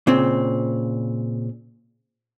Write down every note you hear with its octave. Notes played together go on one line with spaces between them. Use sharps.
A#2 C#3 C4